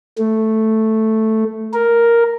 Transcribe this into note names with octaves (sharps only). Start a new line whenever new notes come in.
A3
A#4